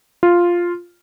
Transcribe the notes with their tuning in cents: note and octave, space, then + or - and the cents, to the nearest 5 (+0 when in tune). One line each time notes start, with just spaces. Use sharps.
F4 +0